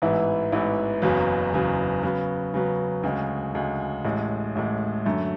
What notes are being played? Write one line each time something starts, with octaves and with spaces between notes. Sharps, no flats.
A1 G#2 E3 B3 E4
A1 G#2 E3 B3 E4
F#1 E2 C#3 F#3 B3
F#1 E2 C#3 F#3 B3
C#3 F#3 B3
C#3 F#3 B3
D2 C#3 G#3
D2 C#3 G#3
A1 A2 G#3
A1 A2 G#3
F#2 D3 A3